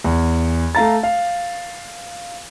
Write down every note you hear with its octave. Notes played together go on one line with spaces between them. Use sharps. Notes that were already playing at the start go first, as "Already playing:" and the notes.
E2
A3 F5 A#5 A6
F5